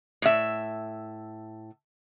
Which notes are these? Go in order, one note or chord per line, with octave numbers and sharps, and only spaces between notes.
A2 E5